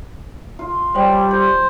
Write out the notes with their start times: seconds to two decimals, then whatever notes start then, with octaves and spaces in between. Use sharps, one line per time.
0.59 F4
0.95 G3 C5 C#5 G5
1.31 C5 C6